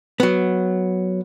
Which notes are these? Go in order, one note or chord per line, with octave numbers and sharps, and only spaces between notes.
F#3 B3